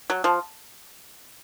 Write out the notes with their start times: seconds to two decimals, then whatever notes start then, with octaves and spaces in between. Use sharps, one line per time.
0.10 F#3
0.24 F3